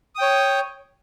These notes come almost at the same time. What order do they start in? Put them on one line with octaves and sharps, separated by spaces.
D#6 G5 C#5